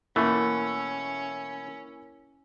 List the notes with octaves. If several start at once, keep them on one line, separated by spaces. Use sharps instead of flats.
B2 E3 A3 A#3 C#4 E4